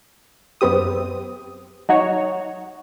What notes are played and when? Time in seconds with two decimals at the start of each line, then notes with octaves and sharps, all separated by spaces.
0.61 F#2 B3 C4 G4 D#6
1.89 F#3 D#4 F#4 C#5